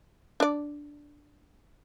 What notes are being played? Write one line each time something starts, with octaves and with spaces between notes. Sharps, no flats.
D4 D5